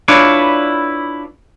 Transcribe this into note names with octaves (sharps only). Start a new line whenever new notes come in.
D4 E4 F4 B4 C#5 D5